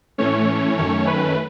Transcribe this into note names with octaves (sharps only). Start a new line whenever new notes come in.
A2 E3 A3 C#4 C#5
F#2 D#3 A3 C#4 C#5
B4